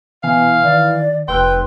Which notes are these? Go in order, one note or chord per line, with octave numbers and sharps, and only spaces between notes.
B2 E3 B3 F5 G#5
D#3 D5
F1 B4 G5 C6 E6 F#6